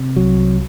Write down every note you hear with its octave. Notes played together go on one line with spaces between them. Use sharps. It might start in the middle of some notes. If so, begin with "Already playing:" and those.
Already playing: C3
C2 F#3